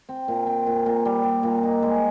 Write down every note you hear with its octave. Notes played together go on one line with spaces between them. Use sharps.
C4
A#2
C4
A#2
A#2
G3
G3
A#2
D#4
G#3